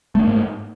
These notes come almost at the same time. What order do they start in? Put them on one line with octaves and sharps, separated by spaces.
A3 D4 A#3 G#2